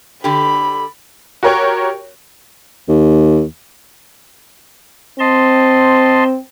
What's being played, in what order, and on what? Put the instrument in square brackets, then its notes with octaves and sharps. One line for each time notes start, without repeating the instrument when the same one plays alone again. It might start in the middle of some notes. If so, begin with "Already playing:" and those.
[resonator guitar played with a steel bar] D3 G4 [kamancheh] B5
[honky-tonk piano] F#4 G4 A#4 C#5 G5 C#6
[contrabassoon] D#2
[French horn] C4 [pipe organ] D#5 A5 C6